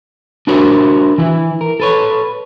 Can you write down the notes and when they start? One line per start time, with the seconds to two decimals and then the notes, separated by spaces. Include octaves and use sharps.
0.47 D4 E4 F#4 A#4 C5
1.18 E3 E4
1.61 A#4
1.80 A4 B4 C#5